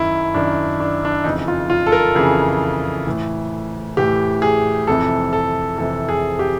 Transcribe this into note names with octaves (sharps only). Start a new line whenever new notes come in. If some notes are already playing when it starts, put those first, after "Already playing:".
Already playing: F#2 D#3 E4
F#2 D#3 D4
D4
D4
F2 C#3 E3 D#4
F4
F4
A4
A#4
F2 C#3 E3 G#4
A2 E3
A2 E3 G4
G#4
F2 C3 E3 A4
A4
F2 C3 E3 A4
G#4
G4